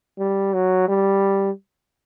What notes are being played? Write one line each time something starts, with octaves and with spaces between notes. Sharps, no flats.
G3
F#3
G3